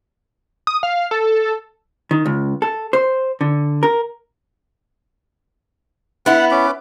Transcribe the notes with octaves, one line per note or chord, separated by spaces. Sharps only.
D#6
F5
A4
D#3
C#2
A4
C5
D3
A#4
B3 E4 F#5
C#4 D6